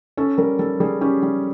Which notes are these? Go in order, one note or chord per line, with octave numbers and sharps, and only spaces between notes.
C#4 A4
G3 A#4
G3 A4
G3 G#4
C#4 G4
G3